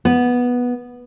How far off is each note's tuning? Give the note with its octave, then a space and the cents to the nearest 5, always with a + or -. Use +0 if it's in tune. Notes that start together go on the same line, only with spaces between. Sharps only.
B3 -10